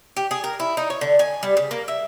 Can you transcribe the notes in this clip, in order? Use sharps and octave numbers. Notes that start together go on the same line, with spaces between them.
G4
G#4
A#4
E4
D#4
C#5
D3
G#5
G3
C#3
A#3
E5